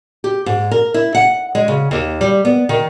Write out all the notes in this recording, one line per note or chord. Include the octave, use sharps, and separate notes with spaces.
G4
G#2
A#4
E4
F#5
G#3
C#3
D#2
G3
B3
D#3